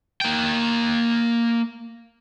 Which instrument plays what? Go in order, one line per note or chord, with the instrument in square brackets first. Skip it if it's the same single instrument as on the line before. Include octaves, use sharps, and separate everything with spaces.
[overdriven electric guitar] A#3 G5